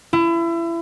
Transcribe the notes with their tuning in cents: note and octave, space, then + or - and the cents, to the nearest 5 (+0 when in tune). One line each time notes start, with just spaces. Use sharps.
E4 +30